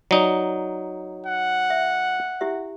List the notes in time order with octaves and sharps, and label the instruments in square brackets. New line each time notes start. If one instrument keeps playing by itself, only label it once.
[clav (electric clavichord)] F#3 D#4 [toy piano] D5 G5
[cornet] F#5
[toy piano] E5
E4 G4 E5